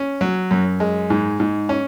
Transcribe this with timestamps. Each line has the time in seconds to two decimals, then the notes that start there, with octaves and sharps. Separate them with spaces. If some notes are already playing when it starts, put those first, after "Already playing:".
Already playing: C#4
0.21 F#3
0.51 F#2
0.80 G#3
1.10 G#2
1.40 G#2
1.69 C#4